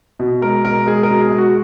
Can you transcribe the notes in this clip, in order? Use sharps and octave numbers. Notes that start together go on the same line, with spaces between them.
B2
G#3 A#4
B2 A#4
G#3 G#4
A#4
B2
G#4
G#3
F#4